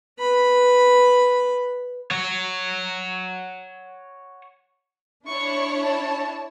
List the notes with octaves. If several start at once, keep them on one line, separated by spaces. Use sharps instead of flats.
B4 B5
C#5 F#5
D4 E4 C#5 C#6
A5